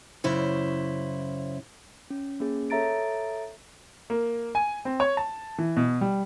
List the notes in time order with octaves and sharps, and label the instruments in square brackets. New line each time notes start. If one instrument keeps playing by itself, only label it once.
[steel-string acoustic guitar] F#2 C#3 E4 C5
[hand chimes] C#4
A#3 C#4 G#4
A4 C#5 E5 A#5 A6 D7
[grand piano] A#3
G#5
C4
C#5
A5
E3
B2
G3